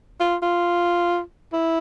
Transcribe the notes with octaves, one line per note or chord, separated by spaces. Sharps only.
F4
F4
E4